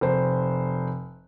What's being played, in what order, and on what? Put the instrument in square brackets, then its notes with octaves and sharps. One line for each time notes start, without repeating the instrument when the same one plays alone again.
[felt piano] F1 C5